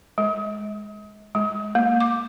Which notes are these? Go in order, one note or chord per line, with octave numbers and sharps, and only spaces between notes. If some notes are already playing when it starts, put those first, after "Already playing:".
G#3
G#3
A#3
D6